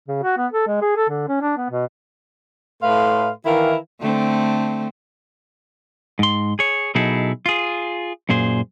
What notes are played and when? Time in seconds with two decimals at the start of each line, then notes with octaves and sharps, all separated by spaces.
0.08 C#3
0.23 F#4
0.37 B3
0.52 A4
0.67 G#3
0.82 G#4
0.97 A4
1.09 D3
1.28 C#4
1.42 D4
1.57 B3
1.70 B2
2.82 A2 A3 B4 F5 C6
3.45 D#3 E3 E4 A#4 F5
4.01 D3 A3 C4
6.19 G#2 C6
6.59 G#4 C#5
6.95 B2 F#3 D#4 E4 G#4 A4
7.46 F4 G#4
8.29 F#2 A#2 G#4 C5